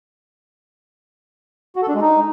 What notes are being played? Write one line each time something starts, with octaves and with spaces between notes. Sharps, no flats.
F#4
A4
D4
G#3
D#4